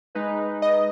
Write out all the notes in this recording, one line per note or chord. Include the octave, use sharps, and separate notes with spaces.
G#3 D#4 B4
D#5